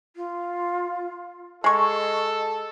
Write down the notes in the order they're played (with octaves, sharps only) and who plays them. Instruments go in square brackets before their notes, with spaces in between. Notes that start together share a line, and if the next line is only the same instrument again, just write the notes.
[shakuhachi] F4
[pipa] G#3 C#6 [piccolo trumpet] A4 [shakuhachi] D#5